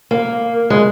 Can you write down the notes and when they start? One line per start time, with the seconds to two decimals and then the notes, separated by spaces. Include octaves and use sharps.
0.11 A#3
0.70 G#3